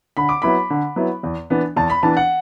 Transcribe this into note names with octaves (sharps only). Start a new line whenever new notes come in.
D3 B5
D6
F#3 B3 E4 B5
D3
F#3 B3 E4
E2
E3 B3 D4
E2 A5
B5
E3 B3 D4 A5
F#5